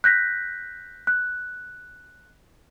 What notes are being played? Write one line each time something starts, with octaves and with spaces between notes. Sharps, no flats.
F#6 G6 A#6 B6
F#6